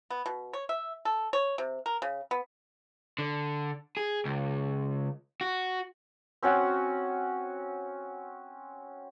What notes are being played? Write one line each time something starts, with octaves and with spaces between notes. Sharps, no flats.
B3
B2
C#5
E5
A4
C#5
C3
A#4
C#3
B3
D3
G#4
C#2
F#4
C4 C#4 F#4 F#5